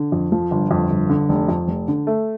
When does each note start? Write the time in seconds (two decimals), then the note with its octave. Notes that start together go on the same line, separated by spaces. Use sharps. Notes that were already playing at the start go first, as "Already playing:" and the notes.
Already playing: D3
0.12 F2
0.32 F3
0.51 G1
0.71 F2
0.90 G1
1.09 D3
1.29 F1
1.48 F2
1.68 F1
1.88 D3
2.07 A3